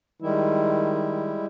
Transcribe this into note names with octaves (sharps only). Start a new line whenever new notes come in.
D#3 G3 G#3 E4